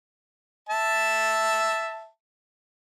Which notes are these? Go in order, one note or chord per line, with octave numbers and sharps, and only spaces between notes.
E5 A5